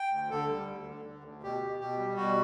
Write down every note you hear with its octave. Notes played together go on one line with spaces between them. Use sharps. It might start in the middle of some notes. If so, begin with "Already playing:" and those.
Already playing: G5
D2
D3 A4
G3
D2
D3
D3
D2
B2 G4
B2
B2 G4
G3
B2 F#4